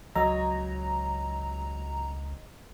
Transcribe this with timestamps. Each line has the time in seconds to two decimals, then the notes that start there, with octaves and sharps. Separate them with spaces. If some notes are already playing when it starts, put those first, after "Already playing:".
0.15 C#2 F#3 D#4 C#5 A#5